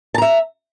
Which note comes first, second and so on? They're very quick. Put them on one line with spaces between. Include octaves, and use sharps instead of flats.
A5 A#5 E5